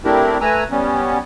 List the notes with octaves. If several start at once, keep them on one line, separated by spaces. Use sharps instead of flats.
A3 C4 D4 E4 G4 A#4
A3 B4 G#5 A#5 E6
G3 B3 C#4